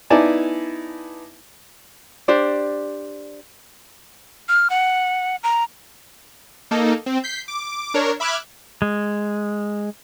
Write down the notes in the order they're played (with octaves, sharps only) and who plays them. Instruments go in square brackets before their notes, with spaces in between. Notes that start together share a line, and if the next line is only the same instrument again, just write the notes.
[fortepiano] B3 D#4 E4 D5 G#5 A5
[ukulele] D4 G4 C5 D5
[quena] F6
F#5
A#5
[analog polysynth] A#3 D#4 A4
C4
G6 B6 C7
D6
D4 A#4 C#5
E5 B5 D6 F6 F#6 G#6
[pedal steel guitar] G#3